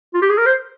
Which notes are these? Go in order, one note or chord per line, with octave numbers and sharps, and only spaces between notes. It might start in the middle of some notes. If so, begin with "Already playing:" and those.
F4
G4
G#4
A#4
C5